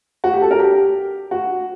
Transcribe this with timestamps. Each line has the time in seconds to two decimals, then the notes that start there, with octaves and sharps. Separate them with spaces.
0.24 F#4
0.33 G4
0.41 A4
0.51 A#4
0.60 G4
1.31 F#4